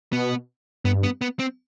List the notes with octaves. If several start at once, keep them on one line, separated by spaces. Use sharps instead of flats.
B2 B3
G2 B3
B3
B3
C4